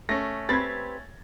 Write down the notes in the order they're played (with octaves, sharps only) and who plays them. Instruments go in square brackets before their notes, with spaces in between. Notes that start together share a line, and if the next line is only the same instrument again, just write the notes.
[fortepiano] A3 C#4 [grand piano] A#6
[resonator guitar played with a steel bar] C4 G4 B4 [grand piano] G#6 A6